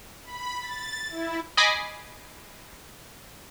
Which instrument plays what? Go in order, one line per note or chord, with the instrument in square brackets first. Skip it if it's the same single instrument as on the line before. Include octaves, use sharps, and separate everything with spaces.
[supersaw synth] B5
A6
E4
[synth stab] D#5 G#5 B5 D6 A#6 C7